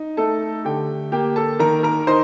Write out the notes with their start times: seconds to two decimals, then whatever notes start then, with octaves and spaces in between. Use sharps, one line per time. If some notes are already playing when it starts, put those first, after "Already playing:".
Already playing: D#4
0.17 A3 A4 A5
0.65 D3 G4 G5
1.12 A#3 G4 G5
1.36 A4 A5
1.59 D#3 A#4 A#5
1.83 A#4 A#5
2.07 D#4 C5 C6